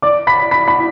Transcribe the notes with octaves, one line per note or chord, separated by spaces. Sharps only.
D5 D6
B5 B6
B5 B6
B5 B6